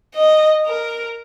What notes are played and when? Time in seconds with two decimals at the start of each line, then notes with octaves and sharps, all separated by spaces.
0.15 D#5
0.66 A#4